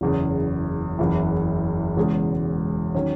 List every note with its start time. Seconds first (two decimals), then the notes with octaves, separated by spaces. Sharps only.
0.01 F#1 E2 C#3
0.99 F#1 E2 C#3 E3
1.96 E1 E2 C#3 G#3
2.95 D#3 F#3 C#4